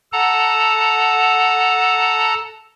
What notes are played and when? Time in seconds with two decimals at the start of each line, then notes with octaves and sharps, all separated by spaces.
0.13 A4 F#5 A5 A#5